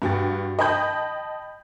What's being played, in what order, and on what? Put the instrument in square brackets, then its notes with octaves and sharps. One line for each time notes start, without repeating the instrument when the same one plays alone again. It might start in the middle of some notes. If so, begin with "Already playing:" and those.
[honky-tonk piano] G2 F#4 G5 A6
D#5 G5 A5 B5 G6